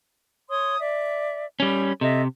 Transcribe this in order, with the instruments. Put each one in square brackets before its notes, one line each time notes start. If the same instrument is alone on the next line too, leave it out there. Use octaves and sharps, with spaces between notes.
[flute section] C#5 C6 D#6
D5 E5
[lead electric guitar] G3 C#4 [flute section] B5
[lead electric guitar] C3 [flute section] A4 D#5 E5